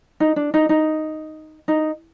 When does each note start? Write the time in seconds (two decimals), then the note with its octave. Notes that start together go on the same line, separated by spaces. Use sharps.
0.20 D#4
0.36 D4
0.54 D#4
0.69 D#4
1.68 D#4